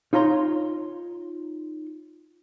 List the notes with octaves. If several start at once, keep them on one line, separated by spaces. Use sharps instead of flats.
D#4 F4 C#5 A#5 C6